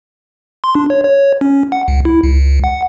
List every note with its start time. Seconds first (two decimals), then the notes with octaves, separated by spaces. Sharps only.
0.64 C6
0.75 D4
0.90 C#5
1.04 C#5
1.41 C#4
1.72 F#5
1.88 C#2
2.05 E4
2.23 C#2
2.64 F#5